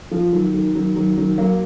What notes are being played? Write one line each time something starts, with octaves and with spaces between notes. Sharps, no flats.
F3
D#3 F#3
D#3 F#3
D#3 F#3
D#3 F#3
D#3 F#3
F#3 A#3